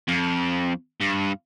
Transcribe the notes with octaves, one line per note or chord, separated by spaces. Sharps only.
F2
G2